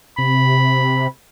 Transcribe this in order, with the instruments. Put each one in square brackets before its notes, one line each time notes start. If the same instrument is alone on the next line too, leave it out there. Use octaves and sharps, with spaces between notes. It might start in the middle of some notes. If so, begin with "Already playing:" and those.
[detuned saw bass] C3 [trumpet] B5